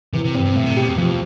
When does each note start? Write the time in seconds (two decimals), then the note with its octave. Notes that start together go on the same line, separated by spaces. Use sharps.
0.14 C3 E3
0.24 C3
0.35 G2 C4
0.45 G2
0.55 A2 A3
0.66 C3
0.77 B2 G4
0.87 E2
0.98 F2 F3